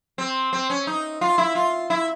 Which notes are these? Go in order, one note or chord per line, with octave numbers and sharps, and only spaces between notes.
C4
C4
C#4
D#4
F4
E4
F4
E4